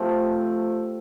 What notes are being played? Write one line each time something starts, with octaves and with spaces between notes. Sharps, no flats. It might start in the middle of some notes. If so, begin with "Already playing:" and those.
Already playing: C3 F3 A3